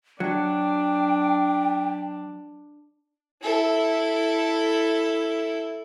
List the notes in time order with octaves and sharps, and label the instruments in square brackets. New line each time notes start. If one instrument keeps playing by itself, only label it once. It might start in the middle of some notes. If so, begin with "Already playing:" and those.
[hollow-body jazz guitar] F#3 [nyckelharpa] D4 [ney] G5
[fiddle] E4 A4